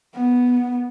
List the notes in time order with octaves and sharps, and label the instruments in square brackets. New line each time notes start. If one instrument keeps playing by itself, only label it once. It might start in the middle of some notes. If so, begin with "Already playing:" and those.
[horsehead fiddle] B3